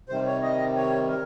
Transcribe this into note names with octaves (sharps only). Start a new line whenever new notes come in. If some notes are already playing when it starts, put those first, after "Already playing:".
C3 D#3 G3 C5
C#5
D#5
C#5
A#4